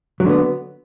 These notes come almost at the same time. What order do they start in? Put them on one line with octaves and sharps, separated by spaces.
F#3 D3 B3